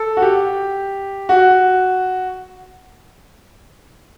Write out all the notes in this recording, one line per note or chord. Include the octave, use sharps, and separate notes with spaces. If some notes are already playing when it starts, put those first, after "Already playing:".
Already playing: A4
F#4
G4
F#4